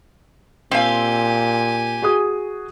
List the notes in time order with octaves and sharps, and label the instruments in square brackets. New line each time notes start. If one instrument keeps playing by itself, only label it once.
[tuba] A#2 [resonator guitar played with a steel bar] C4 F5 [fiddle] G4 G#5
[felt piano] F#4 G#4 D#6